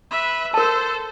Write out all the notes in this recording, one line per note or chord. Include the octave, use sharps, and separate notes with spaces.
B4 E5
A4 A#4 C5 A5